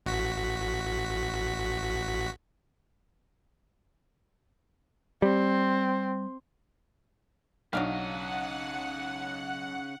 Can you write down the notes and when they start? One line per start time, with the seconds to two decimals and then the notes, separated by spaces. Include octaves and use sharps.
0.06 A1 F#4 B6
5.22 G3 C4
7.73 B1 C#3 F#3 D4 D#5 F5 F#5